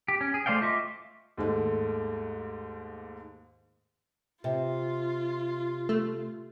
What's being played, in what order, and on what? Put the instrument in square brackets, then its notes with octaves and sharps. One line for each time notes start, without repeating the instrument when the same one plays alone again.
[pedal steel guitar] G4
C#4
G#4
A3 C5 D5 F5 G5
F4 D#5 E5 C#6 D6
[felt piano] D#2 G#2 A3
[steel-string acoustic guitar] C3 [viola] F4
[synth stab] A3